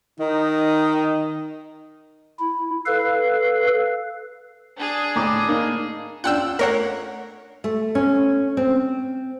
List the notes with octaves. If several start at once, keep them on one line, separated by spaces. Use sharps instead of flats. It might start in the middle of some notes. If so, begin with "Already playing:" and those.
D#3 D#4
E4
A4 B4 F5
D4 G#4
A2 A#5 D6
A#3 D#4
C#4 D4 F4 F#5 G5 E6
F4
A3 A#4 C#5 F#5 C7
A3
C#4
C4